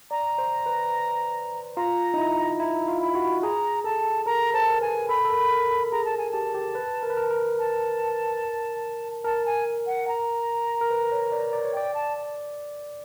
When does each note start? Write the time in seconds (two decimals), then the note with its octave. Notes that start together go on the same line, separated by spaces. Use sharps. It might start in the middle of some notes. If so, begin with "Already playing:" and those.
0.11 D5 A#5
0.38 C5
0.66 B4
1.76 F4 A#5
2.14 D#4
2.18 E4
2.60 E4 A#5
2.88 F4
3.01 B5
3.15 F#4
3.42 G#4 A#5
3.84 A4 A5
4.26 A#4 A#5
4.54 C5 A5
4.70 A#4
4.81 B4 G#5
5.09 A4 B5
5.25 A4
5.30 A#4
5.51 A#4
5.71 A4
5.92 G#4 A#5
6.05 A5
6.18 G#5
6.31 G4 A5
6.54 G4
6.75 B4
7.03 A#4
7.10 B4
7.17 A#4
7.31 A#4
7.59 A5
9.24 A#4 A5
9.46 G#5
9.87 F#5
10.08 A#5
10.81 A#4
10.90 B4
11.12 C#5
11.32 D5
11.53 D5
11.65 C#5
11.73 D5 G5
11.94 A5